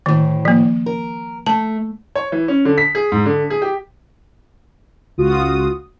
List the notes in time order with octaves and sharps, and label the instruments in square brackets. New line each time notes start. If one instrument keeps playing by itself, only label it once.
[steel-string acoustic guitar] D2 A2 [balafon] D#3
[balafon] F3 A#3
[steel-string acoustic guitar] A#4
[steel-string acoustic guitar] A3 [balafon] A5
[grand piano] C#5
E3
C#4
D3
B6
G#4
G#2
D3
G#4
G4
[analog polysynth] C#2 F4 F#4 D#6